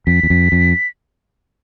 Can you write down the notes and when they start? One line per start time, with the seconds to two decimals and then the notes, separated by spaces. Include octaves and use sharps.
0.07 F2 B6
0.23 E2
0.30 F2
0.52 F2